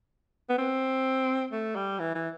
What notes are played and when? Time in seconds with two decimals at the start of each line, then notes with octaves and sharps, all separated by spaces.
0.49 B3
0.58 C4
1.52 A3
1.75 G3
1.99 E3
2.15 E3